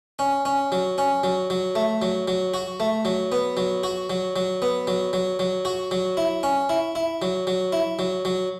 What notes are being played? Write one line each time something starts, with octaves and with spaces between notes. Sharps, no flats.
C#4
C#4
F#3
C#4
F#3
F#3
A3
F#3
F#3
F#4
A3
F#3
B3
F#3
F#4
F#3
F#3
B3
F#3
F#3
F#3
F#4
F#3
E4
C#4
E4
E4
F#3
F#3
E4
F#3
F#3